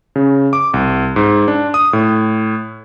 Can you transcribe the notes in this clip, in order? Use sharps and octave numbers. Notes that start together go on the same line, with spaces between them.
C#3
D6
C2
G#2
D4
D#6
A2